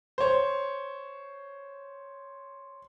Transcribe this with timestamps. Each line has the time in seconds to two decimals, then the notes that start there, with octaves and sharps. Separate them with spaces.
0.18 C5 C#5